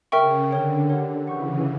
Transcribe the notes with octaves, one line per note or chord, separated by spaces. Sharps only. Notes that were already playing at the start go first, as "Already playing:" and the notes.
C#3 A#4 E5 G5 C#6
D3 A#4 C#5 G5
G4 A#4 C#5 F#5
C#3 E3 F#5 C#6 G6